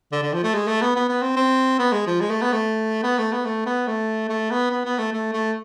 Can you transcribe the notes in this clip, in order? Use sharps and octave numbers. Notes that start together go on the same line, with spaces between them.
D3
D3
F3
A3
G#3
A3
B3
B3
B3
C4
C4
B3
G#3
F3
G#3
A3
B3
A3
B3
A3
B3
A3
B3
A3
A3
B3
B3
B3
A3
A3
A3